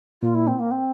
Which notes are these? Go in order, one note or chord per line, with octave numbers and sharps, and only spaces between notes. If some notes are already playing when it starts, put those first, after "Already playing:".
A#2 F4
E4
C4
A#3
C4